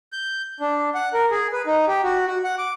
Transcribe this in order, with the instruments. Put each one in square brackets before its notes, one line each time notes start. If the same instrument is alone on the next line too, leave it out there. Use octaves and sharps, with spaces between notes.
[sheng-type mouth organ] G6
D4
F#5
A#4
G#4
B4
D#4
G4
F#4
F#4
F#5
D6